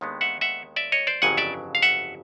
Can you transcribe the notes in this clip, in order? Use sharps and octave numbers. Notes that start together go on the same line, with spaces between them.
D#2 D#3 G#3 B3 D4
E5 F#5
E5 F#5
D5 E5
C#5 D#5
C5 D5
G1 F2 C#3 F#3 F#5 G#5
D5 E5
F5
E5 F#5